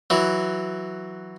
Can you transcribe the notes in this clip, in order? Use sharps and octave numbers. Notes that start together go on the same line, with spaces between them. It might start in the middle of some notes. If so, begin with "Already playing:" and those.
E3 F#3